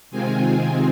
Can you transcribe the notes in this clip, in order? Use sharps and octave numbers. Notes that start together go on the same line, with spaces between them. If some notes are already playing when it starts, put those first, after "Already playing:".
C3 D#3 G#3 C4 F4 G#5